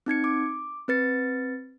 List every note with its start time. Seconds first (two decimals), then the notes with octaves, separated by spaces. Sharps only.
0.06 C4 D#4 G#6 C#7
0.24 D6
0.88 C4 B4 A6 C#7